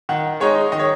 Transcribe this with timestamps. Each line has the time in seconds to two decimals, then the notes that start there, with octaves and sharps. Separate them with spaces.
0.09 D#3 F#5
0.40 G#3 D#4 C#5
0.72 D#3 D#5
0.79 C#5